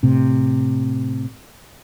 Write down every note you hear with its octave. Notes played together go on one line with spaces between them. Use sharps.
A2 C3